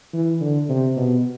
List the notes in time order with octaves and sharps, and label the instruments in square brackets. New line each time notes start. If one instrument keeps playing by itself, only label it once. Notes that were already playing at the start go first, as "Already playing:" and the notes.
[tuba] E3
D3
C3
B2